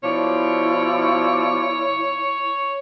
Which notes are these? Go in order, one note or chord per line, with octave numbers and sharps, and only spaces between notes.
B2 F3 E4 C#5 D5